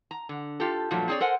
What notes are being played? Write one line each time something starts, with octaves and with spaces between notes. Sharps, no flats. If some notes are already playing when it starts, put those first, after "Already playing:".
A#5
D3
F4 G4 A4
G2 A#2 F3 F#3 A3
C4 D4 G#4 A#4 C#5 D5
A4 A#4 C5 F#5 G#5